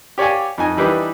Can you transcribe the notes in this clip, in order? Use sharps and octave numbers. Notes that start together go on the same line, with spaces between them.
G4 C#5 D5 F5 G#5
F2 D#4 G#5
E3 G3 D4 D#4 B4